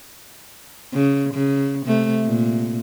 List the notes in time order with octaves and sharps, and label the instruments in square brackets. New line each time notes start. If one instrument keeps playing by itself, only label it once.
[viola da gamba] C#3
C#3
C3 A3
A#2